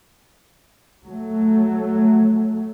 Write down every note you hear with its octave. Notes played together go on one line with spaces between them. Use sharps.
F#3 A3